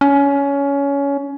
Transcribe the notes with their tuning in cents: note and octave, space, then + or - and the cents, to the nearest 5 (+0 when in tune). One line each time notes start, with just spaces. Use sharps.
C#4 +20